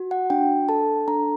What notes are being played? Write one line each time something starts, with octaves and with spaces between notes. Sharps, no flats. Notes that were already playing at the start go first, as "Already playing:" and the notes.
Already playing: F#4
F#5
D4 G5
A4 A5
D4 A#5